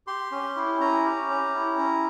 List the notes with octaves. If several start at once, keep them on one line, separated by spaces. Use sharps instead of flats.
G4 C6
C#4
E4
C#4 A#5
G4
C#4
E4
C#4